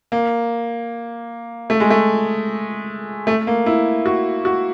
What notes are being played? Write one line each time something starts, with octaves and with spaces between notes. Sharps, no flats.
A#3
A3
G#3
A3
A3
A#3
E4
F#4
F#4